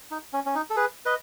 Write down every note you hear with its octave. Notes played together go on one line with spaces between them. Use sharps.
D#4
C#4
C#4
D#4
A4
G#4 B4
B4 D#5